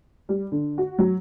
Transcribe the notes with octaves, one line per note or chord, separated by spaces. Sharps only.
G3
D3
F#4
F#3